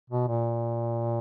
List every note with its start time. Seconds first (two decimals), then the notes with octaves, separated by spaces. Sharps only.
0.10 B2
0.28 A#2